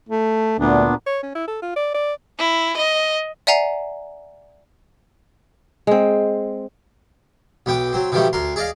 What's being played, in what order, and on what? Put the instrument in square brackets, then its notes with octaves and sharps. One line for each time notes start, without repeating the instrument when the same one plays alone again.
[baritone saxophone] A3
[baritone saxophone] D2 [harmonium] A#2 B3 D4
[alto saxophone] C#5
C#4
E4
A4
F4
D5
D5
[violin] E4
D#5
[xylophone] D5 E5 F#5 G#5 A#5 C7
[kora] G#3 C4
[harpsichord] B1 B3 G5 D6
F#3 C4
B2 D#3 F3 G3 A3
D2 A#4 C6
G#4 D5 D#5 F5